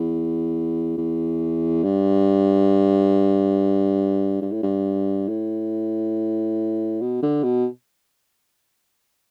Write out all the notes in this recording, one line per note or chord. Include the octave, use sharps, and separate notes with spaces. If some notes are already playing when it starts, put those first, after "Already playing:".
Already playing: E2
E2
G2
G2
A2
G2
A2
B2
D3
B2